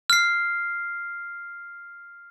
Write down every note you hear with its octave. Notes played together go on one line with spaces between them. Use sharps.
F6 C7